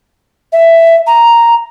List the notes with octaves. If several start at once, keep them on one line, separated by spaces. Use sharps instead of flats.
E5
A#5